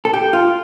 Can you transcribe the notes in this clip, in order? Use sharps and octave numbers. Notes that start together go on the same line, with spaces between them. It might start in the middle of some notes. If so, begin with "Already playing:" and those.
A4
G4
F4